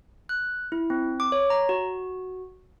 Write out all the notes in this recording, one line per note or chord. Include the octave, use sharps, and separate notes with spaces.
F#6
E4
C4
D6
C#5
A#5
F#4